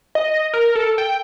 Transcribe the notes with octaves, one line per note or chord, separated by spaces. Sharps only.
D#5
A#4
A4
G5